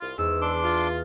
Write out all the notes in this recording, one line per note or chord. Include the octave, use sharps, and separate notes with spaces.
C2 F4
E2 G#2 E6
D4 C6 D6
F4